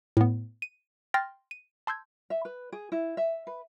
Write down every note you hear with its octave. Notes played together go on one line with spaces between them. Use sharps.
A2 B3
D#7
G5 C6 F6 A6 A#6
D#7
A5 C6 E6 G6 G#6
E5
B4
G#4
E4
E5
B4